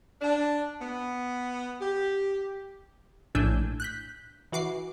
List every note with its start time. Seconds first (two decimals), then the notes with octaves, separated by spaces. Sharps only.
0.21 D4
0.82 B3
1.81 G4
3.35 A#1 A2 D4 G#5 E6 G6
3.80 F#6 G6 B6
4.52 E3 F#4 D6 C7